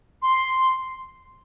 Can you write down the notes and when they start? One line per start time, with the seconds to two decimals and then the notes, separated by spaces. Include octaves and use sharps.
0.22 C6